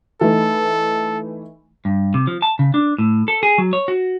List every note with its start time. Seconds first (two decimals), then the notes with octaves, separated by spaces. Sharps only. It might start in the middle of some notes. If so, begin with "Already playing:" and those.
0.21 E3 A3 D#4 A4
1.85 G2
2.14 C3
2.27 F3
2.42 A5
2.59 C#3
2.74 D4
2.98 A2
3.28 A4
3.43 G#4
3.58 F#3
3.73 C#5
3.88 F#4